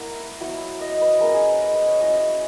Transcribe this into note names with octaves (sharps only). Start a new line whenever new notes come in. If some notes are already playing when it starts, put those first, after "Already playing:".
Already playing: A#3 E4 E5 F#5 A#5
F#3 B3 E4
D#5
B4
G#3 C#4 E4 A#4
G#4
B4
D#5
B4
C#5
F#3 C#4 E4 D#5
E5